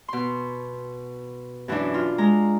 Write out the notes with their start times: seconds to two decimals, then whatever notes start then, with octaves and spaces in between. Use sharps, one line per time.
0.08 B2 C6
1.68 F#2 E3 F#3 D4
1.94 F4
2.18 G#3 A#5